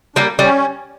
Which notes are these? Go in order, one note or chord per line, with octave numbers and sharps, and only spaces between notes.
G3 A#3 D4
G3 C#4